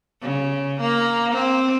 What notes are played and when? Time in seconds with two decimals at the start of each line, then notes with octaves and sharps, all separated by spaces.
0.22 C#3
0.81 A#3
1.32 C4